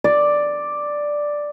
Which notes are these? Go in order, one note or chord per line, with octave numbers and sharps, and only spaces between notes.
D5